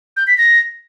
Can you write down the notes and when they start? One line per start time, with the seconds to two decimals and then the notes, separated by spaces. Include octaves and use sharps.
0.17 G6
0.27 B6
0.38 A#6